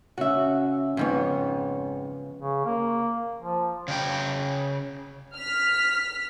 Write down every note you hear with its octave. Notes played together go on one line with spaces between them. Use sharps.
C#3 C#4 F#4 E5
F2 G#2 C#3 B3 C#5
C#3
A#3
F3
C#3 G5
F6 B6